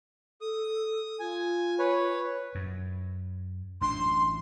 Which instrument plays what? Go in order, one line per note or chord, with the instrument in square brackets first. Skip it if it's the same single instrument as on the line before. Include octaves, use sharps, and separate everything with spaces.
[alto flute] A4 [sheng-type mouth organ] D#6
[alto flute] F4 [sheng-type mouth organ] G#5
[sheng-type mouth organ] B4 C#5
[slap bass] F#2
[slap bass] A1 D4 [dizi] C6